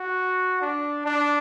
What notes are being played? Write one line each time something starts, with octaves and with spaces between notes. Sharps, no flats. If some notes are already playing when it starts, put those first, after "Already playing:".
Already playing: F#4
D4
D4